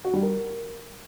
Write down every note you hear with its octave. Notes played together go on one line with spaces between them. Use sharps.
F#4
G3
A#4